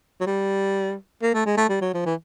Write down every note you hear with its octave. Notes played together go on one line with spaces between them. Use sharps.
F#3
G3
A#3
A3
G#3
A3
G3
F#3
F3
E3